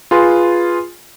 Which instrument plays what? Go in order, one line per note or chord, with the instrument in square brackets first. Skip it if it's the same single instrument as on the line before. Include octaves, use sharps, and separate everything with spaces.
[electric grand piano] F4 G#4 B4 C6